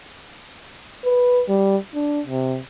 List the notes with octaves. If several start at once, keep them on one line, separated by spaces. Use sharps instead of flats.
B4
G3
D4
C3